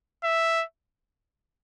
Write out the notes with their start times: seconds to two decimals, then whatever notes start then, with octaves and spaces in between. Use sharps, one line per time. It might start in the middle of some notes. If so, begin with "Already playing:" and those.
0.24 E5